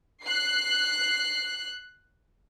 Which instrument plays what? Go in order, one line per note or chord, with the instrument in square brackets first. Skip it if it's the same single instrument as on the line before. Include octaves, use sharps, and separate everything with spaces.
[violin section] F#6 C7